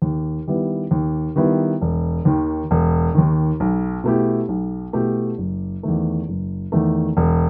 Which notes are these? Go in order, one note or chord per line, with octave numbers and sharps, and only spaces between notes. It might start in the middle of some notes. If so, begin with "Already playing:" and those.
D#2
D#3 G3 B3 E4
D#2
D#3 G3 B3 E4
E1
D#2 D#3
E1
D#2 D#3
B1
B2 A3 E4 G4
B1
B2 A3 E4 G4
F#1
E2 D#3 A3
F#1
E2 D#3 A3
E1